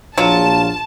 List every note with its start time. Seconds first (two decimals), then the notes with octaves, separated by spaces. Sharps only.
0.18 A#1 F#3 F4 A5